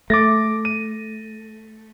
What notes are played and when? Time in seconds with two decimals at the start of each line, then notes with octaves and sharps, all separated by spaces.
0.10 A3 D6 A6 A#6
0.65 D#7